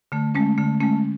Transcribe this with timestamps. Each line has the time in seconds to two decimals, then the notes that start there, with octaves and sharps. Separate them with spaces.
0.12 D3 A3
0.35 G#3 A3 C#4
0.58 D3 A3
0.80 G#3 A3 C#4